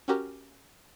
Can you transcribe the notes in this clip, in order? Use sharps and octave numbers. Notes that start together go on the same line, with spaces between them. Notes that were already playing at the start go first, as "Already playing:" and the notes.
C#4 F#4 G4 A#4